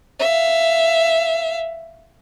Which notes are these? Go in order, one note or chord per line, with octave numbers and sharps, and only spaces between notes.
E5 F5